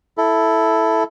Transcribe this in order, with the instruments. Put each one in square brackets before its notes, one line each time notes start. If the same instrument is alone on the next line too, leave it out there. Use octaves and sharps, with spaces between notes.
[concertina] E4 A4